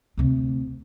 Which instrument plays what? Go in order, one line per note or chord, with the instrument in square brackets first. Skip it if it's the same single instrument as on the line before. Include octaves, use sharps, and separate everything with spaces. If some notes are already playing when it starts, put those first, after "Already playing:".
[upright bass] D2 C3